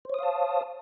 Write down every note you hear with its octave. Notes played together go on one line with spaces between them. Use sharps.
C5 C#5 F5 A5 D#6